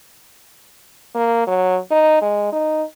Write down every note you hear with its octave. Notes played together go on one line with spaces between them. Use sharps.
A#3
F#3
D#4
G#3
D#4